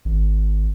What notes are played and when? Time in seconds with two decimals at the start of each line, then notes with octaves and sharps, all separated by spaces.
0.05 G#1